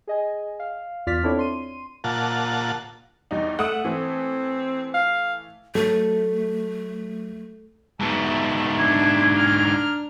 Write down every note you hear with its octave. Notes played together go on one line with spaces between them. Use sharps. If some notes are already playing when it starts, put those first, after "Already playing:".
G#4 D#5 G#5
F5
E2 F4 D5 F6 A6 B6
C4 D4 E4 A4 C#5 D5
C6 D#7
A#2 F4 F#5 A5
E2 G3 D#4
A3 F#5 D#6
E3 A3 C4
F5
F#3 A3 A4
G#2 B2 E5 A5
D4 G#6
A#5 F6